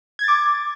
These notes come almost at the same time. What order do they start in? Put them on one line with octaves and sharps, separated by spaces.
G#6 A6 D6